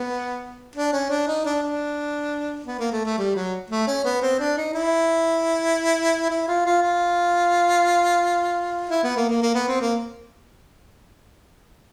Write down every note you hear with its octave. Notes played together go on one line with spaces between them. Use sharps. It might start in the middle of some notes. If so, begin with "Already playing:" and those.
Already playing: B3
D4
C#4
D4
D#4
D4
D4
B3
A#3
A3
A3
G3
F#3
A3
C#4
B3
C4
D4
D#4
E4
E4
F4
F4
F4
E4
B3
A#3
A#3
A#3
B3
C4
A#3